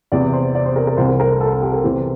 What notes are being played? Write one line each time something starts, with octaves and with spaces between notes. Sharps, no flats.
E2 C3 E3 D5
C5
D5
C5
A#4
A#4
C2 C3 E3 C5
A#4
A#4
A4
A4
A4
G4
A#4
E2 C3 E3 C5